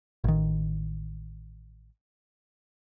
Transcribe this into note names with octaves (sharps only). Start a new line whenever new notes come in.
A1 D#3